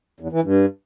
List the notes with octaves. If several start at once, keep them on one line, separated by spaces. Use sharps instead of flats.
E2
E3
G2